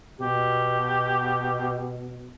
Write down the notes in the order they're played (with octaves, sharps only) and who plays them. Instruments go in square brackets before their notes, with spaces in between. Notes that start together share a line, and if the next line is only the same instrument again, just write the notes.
[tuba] B2 [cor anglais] G4